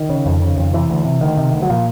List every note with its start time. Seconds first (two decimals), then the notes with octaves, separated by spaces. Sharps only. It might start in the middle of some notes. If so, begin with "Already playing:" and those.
Already playing: D#3
0.09 C#3
0.26 F2
0.42 C#3
0.57 F2
0.73 C3 E3
0.90 D2
1.05 C3
1.21 D2 D#3
1.37 C3
1.53 D2
1.62 F#3
1.69 A#2 F3